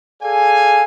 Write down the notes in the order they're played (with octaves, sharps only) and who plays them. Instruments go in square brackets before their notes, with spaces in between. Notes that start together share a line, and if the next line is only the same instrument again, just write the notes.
[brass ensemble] G#4 A4 D5 F5 G#5